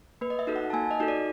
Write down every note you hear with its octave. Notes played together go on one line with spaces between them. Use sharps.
A#3 B4
D#5
E5
D#4 F#4 A4
F#5
A5
A#3 G#5
D#5
D#4 F#4 A4
D5